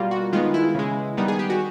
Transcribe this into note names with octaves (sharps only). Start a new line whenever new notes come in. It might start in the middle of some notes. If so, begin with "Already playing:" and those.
Already playing: B2 G3 A#3 F4
F#4
D#3 G#3 B3 F4
E4
C#3 E3 G#3
D#3 G3 B3 D#4
G#4
G4
F#4